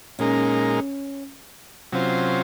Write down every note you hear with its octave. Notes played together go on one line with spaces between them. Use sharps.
A#2 G#3 C#4 D#4 A#4
C3 F#3 C#4 F4 C5